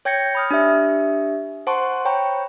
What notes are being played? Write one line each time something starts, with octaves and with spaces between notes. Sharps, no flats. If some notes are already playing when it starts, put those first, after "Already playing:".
C#5 G5 G6 G#6 A#6 C#7
B5 D#6 F6
D4 G4 E5
C5 F#5 A5 C6 C#6
C5 C#5 G5 A#5 B5 C#6